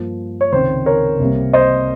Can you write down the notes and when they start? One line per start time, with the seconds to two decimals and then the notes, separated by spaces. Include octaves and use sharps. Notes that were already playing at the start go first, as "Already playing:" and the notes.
Already playing: G2 F3 A#3
0.41 C#5
0.52 C#2 C3 D#3 C5
0.86 A#4 C#5
1.19 C2 C3 G3 A#3
1.53 C5 D#5